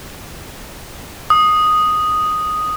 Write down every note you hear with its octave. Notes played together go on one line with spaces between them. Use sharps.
D#6